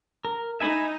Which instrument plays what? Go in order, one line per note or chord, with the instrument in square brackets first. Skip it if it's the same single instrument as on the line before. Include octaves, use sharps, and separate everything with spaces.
[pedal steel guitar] A#4
[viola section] D#4 [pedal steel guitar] E5 G#5 B5